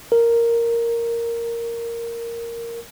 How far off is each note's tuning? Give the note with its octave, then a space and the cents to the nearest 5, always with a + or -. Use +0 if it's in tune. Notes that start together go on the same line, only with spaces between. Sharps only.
A#4 -5